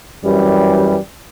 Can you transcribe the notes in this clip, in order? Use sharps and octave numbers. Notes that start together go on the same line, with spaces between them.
F#2 E3 G3